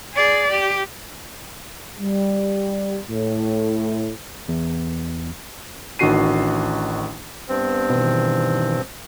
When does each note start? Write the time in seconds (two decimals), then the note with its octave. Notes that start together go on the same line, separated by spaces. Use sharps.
0.14 G#4 D5
0.51 G4
2.00 G3
3.09 A2
4.49 E2
5.99 A1 D#3 D4 F#4 C7 D#7
7.49 G2 B3 C4
7.90 B2 D#3 E3